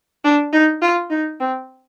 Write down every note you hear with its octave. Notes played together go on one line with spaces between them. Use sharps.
D4
D#4
F4
D#4
C4